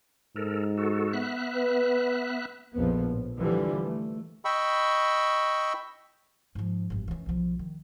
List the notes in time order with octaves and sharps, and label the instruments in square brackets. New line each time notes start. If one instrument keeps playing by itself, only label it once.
[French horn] G#2 [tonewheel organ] A4 A#4
[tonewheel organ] F#4 A4
B3 E5 F#6
[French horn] B4
[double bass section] A#1 F2 F3 B3
A2
D3 E3 F3 G3
A3
[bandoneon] D#5 G5 B5 C#6 E6
[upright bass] G#2 F3
G#1 G2
E3 C#4
B1 F3
D#3